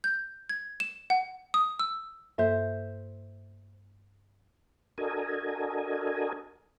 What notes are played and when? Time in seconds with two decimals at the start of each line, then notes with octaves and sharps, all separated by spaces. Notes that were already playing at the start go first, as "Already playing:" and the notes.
0.04 G6
0.49 G#6
0.80 E7
1.10 F#5
1.54 D#6
1.79 E6
2.38 G2 A#3 A4 C5 E5
4.98 D4 F#4 A4 A#4 D#5 G#5